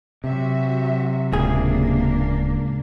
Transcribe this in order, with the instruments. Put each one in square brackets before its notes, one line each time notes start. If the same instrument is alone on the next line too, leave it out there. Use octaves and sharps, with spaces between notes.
[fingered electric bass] C3 [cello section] F#3 F#4 E5
[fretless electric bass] D1 [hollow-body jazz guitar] C#2 G#4 [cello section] A#3 D4